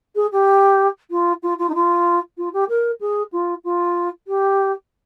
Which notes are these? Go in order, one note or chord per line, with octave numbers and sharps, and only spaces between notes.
G#4
G4
F4
F4
F4
D#4
F4
F4
G4
A#4
G#4
F4
F4
G4